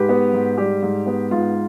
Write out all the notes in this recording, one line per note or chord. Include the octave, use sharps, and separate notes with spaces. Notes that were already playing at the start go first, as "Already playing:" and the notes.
Already playing: G#2 G4 B4
B3
G#2
G3 G4
G#2
B3
G#2 F4